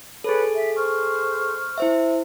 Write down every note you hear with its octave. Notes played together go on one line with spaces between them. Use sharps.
G#4 A4 B4 C#5 B5
E5
C5 C#6 F6
E4 C5 E5